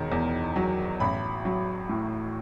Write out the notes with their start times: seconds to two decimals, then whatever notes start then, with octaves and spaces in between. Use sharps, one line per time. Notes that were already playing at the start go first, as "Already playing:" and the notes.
Already playing: E1 D#3
0.12 E2
0.56 F#3
1.00 A1 B5
1.45 F#3
1.89 A2